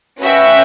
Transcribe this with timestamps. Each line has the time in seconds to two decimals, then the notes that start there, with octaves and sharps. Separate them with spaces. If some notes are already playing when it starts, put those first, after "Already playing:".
0.20 C#4 F#4 B4 E5 G5